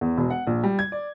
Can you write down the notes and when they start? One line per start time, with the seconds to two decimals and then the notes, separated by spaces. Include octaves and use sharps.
0.01 E2
0.17 E1
0.30 F#5
0.47 A#1
0.64 G3
0.79 G#6
0.92 D5